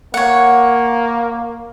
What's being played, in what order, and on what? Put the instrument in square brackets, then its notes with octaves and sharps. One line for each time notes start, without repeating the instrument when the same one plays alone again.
[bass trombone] A#3 [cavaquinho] C#5 F#5